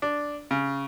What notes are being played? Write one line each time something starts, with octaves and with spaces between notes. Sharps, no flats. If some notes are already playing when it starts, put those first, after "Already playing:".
D4
C#3